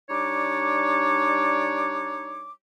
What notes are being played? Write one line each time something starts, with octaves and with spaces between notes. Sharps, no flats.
G3 D4 D#4 C#5 D5 D6